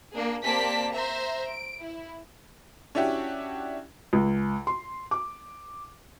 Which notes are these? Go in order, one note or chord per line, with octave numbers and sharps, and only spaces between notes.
A#3 D4 G#4
A#3 C4 G4 D5 A5 B6
C5 E5 A#5
D7
E4
C#4 D4 E4 F#4 G4
C#2
C6
D6